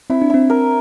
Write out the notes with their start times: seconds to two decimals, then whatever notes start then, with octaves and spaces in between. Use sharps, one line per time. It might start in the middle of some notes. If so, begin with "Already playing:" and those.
0.10 C4 E4
0.22 D4
0.30 C4 E4
0.50 A#4